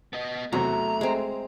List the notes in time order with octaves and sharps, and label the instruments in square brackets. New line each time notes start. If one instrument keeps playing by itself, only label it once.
[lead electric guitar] B3 D#5
[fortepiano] E2 C3 F#3 [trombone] A3 [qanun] F#4 [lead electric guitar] A#5
[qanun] G#3 C4